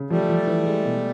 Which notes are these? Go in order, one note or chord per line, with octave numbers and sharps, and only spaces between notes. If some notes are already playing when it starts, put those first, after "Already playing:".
Already playing: C#3
F3 G3 A3
F3
E3
G#3
B2